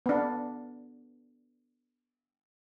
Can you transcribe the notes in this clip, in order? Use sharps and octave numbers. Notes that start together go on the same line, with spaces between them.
B3 D4